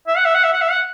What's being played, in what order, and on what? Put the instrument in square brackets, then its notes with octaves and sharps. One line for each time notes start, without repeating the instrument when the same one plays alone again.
[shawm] E5
F#5
E5
F#5
E5
F#5
E5
F#5